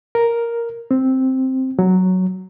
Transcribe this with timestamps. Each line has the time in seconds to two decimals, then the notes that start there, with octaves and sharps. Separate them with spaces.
0.15 A#4
0.91 C4
1.79 F#3